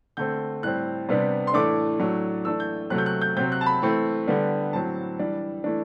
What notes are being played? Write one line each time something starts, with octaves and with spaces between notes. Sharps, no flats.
D3 A3 C4 G6
A2 G3 C4 F#6
C3 G3 B3 D4
C6
A2 E3 A3 D4 D6
A2 F#3 A3 D4
E3 A3 D4 E6
G6
C3 F#3 A3 F#6
G6
F#6
G6
C3 F#3 C4 G6
F#6
A5
B5
E3 A3 C4
D3 G3 B3 D4
A2 F#3 C4 A5
E3 G3 D4
E3 A3 D4